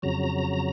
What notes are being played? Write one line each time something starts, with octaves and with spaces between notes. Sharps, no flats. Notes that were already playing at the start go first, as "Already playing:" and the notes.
F2 C#3 F#3 A#5